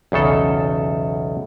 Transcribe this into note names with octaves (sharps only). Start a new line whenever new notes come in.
B1 E2 C#3 A4